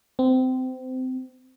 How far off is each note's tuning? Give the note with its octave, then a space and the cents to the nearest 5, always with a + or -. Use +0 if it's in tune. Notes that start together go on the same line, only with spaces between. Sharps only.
C4 -25